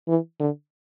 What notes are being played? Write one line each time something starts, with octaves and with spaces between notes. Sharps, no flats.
E3
D3